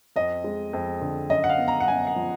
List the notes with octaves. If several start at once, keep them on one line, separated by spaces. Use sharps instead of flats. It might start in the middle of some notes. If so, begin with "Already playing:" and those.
F2 D#5
G#3
F2
D3
F#2 D#5
F#5
F5
B3
A#5
F#5
F#2 G#5
F#5
F3